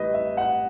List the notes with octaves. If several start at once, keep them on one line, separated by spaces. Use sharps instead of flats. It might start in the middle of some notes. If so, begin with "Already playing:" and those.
Already playing: A1 A2 G3 B4 D#5
E5
F#5